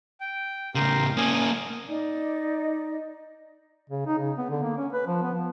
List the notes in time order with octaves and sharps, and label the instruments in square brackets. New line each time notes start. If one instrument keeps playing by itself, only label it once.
[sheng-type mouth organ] G5
[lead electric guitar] A2 C#3 [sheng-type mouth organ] G4 A#4 C6
[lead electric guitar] A#3 C#4 [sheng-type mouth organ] G#5 D#6
[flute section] D#4 D5
[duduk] C#3
D#4
C#3
B3
D3
A#3
C#4
B4
F3
B3
F3